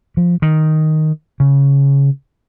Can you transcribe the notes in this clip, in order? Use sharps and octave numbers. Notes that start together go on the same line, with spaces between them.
F3
D#3
C#3